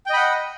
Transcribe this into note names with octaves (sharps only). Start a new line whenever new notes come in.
D#5 F#5 G5 B5